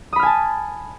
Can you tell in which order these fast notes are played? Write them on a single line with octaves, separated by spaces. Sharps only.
D#6 B5 F6 G#5 A5